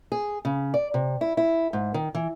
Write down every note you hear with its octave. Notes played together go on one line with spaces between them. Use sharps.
G#4
C#3
D5
C3
E4
E4
G#2
D#3
E3